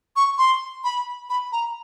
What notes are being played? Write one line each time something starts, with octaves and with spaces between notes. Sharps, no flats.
C#6
C6
B5
B5
A#5